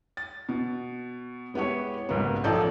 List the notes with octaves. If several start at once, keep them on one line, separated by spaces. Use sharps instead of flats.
A6
B2
G#3 B3 E4 G4 C#5
B1 G#2 C#3 A#3 B3
A1 F3 D#4 A4 D5 G6